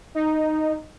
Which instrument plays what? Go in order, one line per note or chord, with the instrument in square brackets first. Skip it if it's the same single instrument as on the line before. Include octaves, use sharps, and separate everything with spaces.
[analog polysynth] D#4